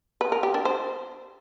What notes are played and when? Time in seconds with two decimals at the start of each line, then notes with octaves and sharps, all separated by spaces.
0.21 B4
0.32 A#4
0.43 G4
0.54 D4
0.65 C5